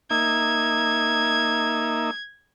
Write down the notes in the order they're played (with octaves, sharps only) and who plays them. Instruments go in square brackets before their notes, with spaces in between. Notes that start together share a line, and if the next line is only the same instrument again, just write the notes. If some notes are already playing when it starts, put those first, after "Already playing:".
[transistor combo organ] A#3 D#4 E5 [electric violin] G#6